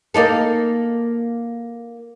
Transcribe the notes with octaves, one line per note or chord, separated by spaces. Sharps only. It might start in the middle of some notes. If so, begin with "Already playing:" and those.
A#3 D#4 A4